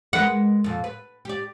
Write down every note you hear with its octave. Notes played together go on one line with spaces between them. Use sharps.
G#3 A#4 B4 F#5
F2 A#2
B4
G4 D5